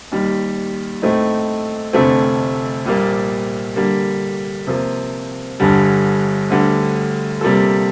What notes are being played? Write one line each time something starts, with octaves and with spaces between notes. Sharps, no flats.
D#2 D#3 G3
A2 A3 C4 D#4
F1 F2 D3 A3 C4
A#1 A#2 G3 A#3
D3 G3 A#3
C3 F3 A#3
G1 G2 D3 G3
D2 D3 G3
C3 G3 A#3 F4 A4